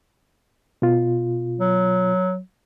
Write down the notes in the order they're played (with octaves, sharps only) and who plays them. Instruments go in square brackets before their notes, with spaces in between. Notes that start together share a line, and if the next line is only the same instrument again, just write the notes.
[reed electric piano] B2 F4
[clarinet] F#3